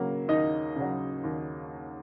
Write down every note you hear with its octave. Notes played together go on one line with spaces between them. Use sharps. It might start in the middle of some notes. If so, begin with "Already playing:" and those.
Already playing: C#3 F#3 A#3
D#2 D#4 D#5
C#3 F#3
D#2